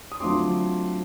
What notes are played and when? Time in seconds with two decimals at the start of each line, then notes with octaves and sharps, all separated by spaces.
0.12 D#6
0.20 D3 F#3 A3 C4 F4 C6 D6